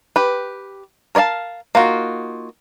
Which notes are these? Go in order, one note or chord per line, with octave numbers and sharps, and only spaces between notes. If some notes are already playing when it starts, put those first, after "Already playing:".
G4 B4
A#4 C#5 D5 F5 A5
A#3 D#4 F4 F#4